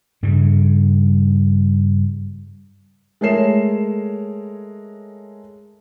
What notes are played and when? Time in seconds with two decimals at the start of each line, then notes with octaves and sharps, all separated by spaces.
0.23 G2 C#3 G3
3.21 G#3 A3 A#4 C#5 C7 E7